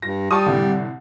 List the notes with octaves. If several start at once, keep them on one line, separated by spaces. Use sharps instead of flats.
G2 A#6
G3 A5 C#6 D#6
C2 A2 D3